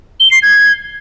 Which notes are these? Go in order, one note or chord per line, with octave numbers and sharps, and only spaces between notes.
G7
C7
G#6